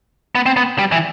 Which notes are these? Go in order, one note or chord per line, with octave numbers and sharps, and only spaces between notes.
B3
C4
B3
G3
E3